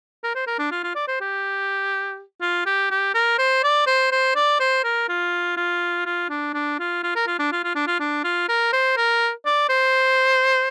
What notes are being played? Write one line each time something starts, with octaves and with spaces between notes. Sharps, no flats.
A#4
C5
A#4
D4
F4
F4
D5
C5
G4
F4
G4
G4
A#4
C5
D5
C5
C5
D5
C5
A#4
F4
F4
F4
D4
D4
F4
F4
A#4
F4
D4
F4
F4
D4
F4
D4
F4
A#4
C5
A#4
D5
C5